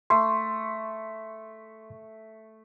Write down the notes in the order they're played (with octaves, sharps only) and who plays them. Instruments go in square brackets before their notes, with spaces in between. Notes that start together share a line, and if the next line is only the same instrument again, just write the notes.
[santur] A3 [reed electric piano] C6